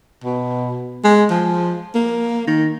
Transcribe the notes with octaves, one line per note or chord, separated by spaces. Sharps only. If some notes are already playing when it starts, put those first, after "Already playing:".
B2
G#3
F3
A#3
D#3